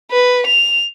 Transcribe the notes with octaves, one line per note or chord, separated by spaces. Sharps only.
B4
F7